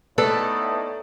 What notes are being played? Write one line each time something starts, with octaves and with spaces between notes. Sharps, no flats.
A2 A3 B3 D#4 A4 D5 A5